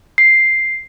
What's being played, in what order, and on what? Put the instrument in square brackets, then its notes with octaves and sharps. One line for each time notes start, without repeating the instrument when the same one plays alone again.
[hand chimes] C7